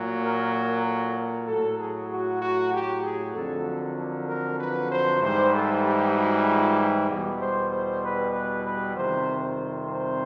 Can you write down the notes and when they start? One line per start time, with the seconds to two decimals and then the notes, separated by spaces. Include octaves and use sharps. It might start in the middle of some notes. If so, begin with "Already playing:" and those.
Already playing: A#2 F#3
0.23 A#4
0.54 A#4
0.86 A4
1.17 A#4
1.47 A2 F#3 A4
1.79 G#4
2.10 F#4
2.42 F#4
2.72 G4
3.03 G#4
3.34 F2 D3 F#3 A4
3.82 A#4
4.28 A#4
4.60 B4
4.91 C5
5.21 G#2 E3 G3 C5
5.53 A4
5.84 G4
6.16 F#4
6.47 F4
6.77 G4
7.08 E2 B2 G3
7.39 C5
7.72 C5
8.02 B4
8.33 B4
8.65 B4
8.96 F2 C3 D#3 G3 C5
9.43 C5
9.89 C5